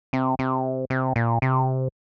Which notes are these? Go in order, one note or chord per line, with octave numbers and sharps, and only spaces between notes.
C3
C3
C3
A#2
C3